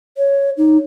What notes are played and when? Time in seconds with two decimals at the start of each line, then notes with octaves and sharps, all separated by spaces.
0.18 C#5
0.57 D#4